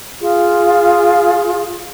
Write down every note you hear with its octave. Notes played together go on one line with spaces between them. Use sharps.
F4 G#4